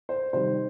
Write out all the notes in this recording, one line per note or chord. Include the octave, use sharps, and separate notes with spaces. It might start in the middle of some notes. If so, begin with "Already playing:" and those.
C5
C3 D#3 G3 C5